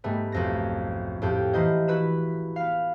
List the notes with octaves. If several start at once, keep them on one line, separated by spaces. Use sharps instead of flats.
G#2 G3 A3 B3
B1 F2 A#6
F2 A2 G4 G6
E3 A#3 E4 C5 D#5 G6
E4 F#4 B4 B5 E7
B3 F5